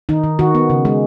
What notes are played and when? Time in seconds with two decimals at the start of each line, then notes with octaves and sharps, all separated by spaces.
0.09 D#3 D#4
0.24 D#3
0.39 D#3 F#4
0.55 B3
0.70 C#3
0.85 G#3